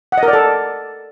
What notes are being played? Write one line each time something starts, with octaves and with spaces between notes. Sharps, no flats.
F#5
D#5
A#4
D5
A4